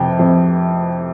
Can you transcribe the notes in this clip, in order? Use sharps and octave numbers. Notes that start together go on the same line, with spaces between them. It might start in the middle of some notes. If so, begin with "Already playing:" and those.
Already playing: F2 C3 G5
F2